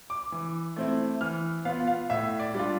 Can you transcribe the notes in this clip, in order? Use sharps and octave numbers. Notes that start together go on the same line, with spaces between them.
D6
E3
A3 C4 E4
E3 F6
B3 F4 F5
F5
A2 E5
D5
G3 D4 F4